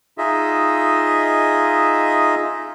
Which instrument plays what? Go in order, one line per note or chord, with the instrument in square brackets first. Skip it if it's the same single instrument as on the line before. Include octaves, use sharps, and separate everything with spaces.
[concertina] D#4 F4 G#4 D#5 E5